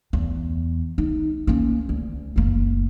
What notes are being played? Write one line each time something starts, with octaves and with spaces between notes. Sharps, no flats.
E2
D#4
A#3 C#4
D2
F#1 A#3